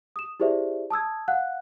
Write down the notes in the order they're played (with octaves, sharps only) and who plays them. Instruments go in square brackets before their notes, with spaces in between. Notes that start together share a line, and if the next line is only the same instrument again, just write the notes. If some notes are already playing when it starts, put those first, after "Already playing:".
[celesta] D#6 E7
E4 G4 G#4 C5 D5 E5
A5 D#6 E6 G#6
F5 F#5 F#6